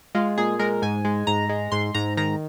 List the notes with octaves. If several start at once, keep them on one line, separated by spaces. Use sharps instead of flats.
G#3 F4
A#2 G#4
G#3 A#4
G#2 G#5
G#3
G#2 A#5
G#3
G#2 C6
G#2 A#5
D#3 A#5